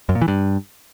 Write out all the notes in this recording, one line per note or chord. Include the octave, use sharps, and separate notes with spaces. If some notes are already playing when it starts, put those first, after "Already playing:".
F#2
A#2
E3
G2